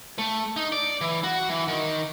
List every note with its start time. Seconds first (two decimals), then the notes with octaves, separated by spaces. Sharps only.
0.18 A3
0.57 D#4
0.72 D5
1.01 E3
1.24 F#4
1.49 E3
1.68 D#3